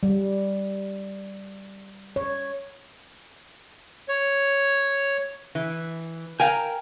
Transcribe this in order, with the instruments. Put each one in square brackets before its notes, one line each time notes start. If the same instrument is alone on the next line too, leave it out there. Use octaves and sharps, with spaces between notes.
[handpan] G3
C#5
[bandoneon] C#5
[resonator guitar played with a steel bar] E3
[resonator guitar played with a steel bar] A#4 G5 A#5 [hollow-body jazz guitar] F5 G#5